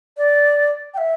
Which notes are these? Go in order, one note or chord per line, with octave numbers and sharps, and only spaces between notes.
D5
G5
E5